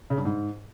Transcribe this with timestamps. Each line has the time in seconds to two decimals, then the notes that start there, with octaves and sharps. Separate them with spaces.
0.10 C#3
0.18 G2
0.25 G#2